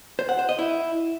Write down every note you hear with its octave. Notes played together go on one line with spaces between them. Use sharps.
C5
F#5
C5
D#5
E4